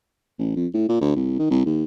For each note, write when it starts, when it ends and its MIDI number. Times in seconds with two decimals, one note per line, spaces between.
0.39 0.51 33
0.56 0.67 41
0.74 0.84 45
0.89 1.00 46
1.01 1.13 38
1.16 1.38 36
1.39 1.50 51
1.50 1.65 36
1.66 1.84 39